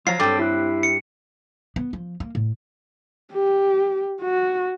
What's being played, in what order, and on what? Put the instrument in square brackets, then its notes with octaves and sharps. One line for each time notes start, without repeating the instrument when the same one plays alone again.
[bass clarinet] F3 [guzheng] F#3 [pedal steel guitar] F4 F5 A#5 [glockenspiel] C7
[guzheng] G2 C4 [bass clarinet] A4 [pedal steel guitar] G5 A5 D6
[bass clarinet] E4 [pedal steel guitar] G4 F#6
[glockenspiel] C#7
[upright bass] B3
F3
A#3
A2
[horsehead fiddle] G4
F#4